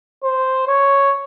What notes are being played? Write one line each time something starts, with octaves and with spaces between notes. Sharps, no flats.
C5
C#5